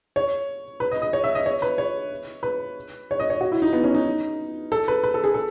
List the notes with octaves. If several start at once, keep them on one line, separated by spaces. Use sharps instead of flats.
C#5
B4
D#5
D#5
C#5
E5
D#5
C#5
B4
C#5
B4
C#5
D#5
C#5
F#4
E4
D#4
B3
C#4
D#4
A4
B4
B4
A4
G#4
A4